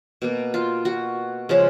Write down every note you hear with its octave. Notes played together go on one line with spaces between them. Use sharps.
B2 A#3
F4
F#4
C#3 F3 G#3